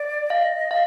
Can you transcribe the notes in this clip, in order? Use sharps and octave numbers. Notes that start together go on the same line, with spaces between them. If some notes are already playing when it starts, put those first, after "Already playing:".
Already playing: D5
D#5 F5
F5